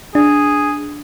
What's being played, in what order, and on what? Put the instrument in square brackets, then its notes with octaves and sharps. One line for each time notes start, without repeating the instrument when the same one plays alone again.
[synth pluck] D4 [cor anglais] G#4